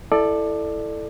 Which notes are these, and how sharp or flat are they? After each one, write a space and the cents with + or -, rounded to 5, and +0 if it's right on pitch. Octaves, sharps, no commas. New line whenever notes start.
E4 +0 A4 +0 D5 +20